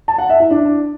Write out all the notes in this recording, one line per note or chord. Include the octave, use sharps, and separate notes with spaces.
A5
F#5
E5
E4
D4